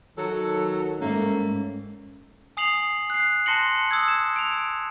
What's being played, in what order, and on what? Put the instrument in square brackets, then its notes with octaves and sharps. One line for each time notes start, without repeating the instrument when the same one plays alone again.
[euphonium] D#3 [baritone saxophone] F#3 [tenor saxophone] A4
[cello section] G#2 G3 [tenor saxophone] A3 [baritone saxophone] A#3 [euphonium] C#4
[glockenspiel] G#5 D#6 C7 F7 F#7
F#6 C7
A5 C6 A#6 C#7 F#7
D#6 E6 G#6
E7
D7 F7